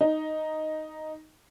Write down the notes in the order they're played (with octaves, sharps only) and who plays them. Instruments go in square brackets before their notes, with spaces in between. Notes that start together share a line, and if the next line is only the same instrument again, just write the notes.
[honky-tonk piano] D#4